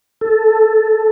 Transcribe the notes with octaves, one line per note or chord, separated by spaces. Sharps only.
A4